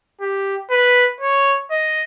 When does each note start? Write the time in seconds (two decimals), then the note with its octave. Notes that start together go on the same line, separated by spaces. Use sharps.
0.21 G4
0.71 B4
1.21 C#5
1.71 D#5